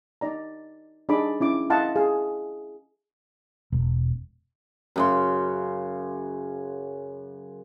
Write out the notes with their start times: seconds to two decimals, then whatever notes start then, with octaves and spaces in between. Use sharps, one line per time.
0.21 D#4 D5 A#5
1.09 D4 D#4 G#4 D5 B5 D6
1.41 C#4 E4 D6
1.70 E4 D#5 F5 F#5 A5 C6
1.96 G#4 F5
3.72 E1
4.96 F#2 C#3 C6